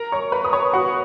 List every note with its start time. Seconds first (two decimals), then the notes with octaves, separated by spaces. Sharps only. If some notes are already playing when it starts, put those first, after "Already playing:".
Already playing: A#4 A#5
0.12 C#5 C#6
0.32 B4 B5
0.44 D#6
0.53 C#5 C#6
0.73 F#4 F#5